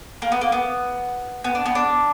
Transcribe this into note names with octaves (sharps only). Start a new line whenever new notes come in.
A#3
B3
A#3
B3
B3
D4
B3
D4